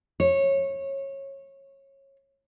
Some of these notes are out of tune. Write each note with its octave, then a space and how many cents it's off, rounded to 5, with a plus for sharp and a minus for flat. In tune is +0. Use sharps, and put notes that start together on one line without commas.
C#5 -20